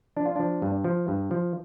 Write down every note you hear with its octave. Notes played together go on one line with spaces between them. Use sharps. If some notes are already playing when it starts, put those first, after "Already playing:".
F3 D4
F4
F3 D4
G2
F3
G2
F3